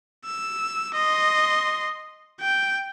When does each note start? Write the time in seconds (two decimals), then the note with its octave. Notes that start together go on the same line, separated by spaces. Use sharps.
0.25 E6
0.95 D#5 C6
2.40 G5